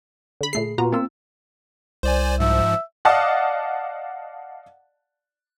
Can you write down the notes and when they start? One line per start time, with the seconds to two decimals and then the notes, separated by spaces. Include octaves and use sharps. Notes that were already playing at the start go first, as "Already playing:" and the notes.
0.41 D3 B5
0.53 A#2 A3 G#4 C7
0.78 A#2 B3 F4 F#4 A#5
0.92 A#3 C4 F4 E6
2.03 C2 C5 D5 G#5
2.40 G#2 F3 E5
3.05 D5 D#5 F5 F#5 A5 D#6